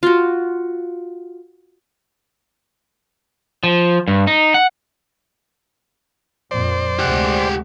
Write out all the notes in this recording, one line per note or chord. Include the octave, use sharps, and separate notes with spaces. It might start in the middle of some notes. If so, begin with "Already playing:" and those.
F4 F#4
F3
G2
D#4
F#5
F2 A#2 C5 D5
D2 C3 G#3 G4 F#5